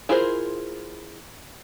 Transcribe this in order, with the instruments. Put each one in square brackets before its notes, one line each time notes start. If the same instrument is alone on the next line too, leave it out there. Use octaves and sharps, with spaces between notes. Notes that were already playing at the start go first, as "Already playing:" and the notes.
[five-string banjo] E4 F4 G#4 A#4 C5